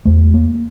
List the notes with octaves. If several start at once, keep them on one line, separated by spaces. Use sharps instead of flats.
E2 A3
A#3